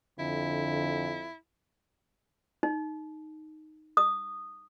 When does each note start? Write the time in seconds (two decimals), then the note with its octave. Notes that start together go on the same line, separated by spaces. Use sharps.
0.19 F2 D3 E4
2.63 D#4
3.97 D#6